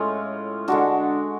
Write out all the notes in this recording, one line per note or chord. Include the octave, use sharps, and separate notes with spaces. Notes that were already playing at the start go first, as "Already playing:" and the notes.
Already playing: A2 G#3 C#4 F4
D3 G#3 D4 F#4